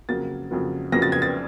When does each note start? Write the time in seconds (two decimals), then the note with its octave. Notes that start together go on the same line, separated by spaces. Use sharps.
0.09 F2 C#3 F#3 A#3 A6
0.51 F2 C#3 F#3 A#3
0.92 F2 C#3 F#3 A#3 A#6
1.02 A6
1.12 G#6
1.22 A6